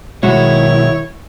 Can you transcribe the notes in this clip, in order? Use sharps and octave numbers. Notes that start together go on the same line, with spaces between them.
B1 D#3 G#3 E4 F#4 C#5